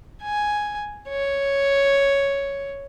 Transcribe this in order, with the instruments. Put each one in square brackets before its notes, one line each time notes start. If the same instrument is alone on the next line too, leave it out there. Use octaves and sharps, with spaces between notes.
[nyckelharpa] G#5
C#5